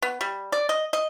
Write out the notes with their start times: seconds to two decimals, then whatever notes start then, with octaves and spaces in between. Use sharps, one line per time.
0.02 B3
0.21 G3
0.52 D5
0.69 D#5
0.93 D#5